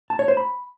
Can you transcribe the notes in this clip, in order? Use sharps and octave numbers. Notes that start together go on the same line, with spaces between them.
A5
C#5
C5
B5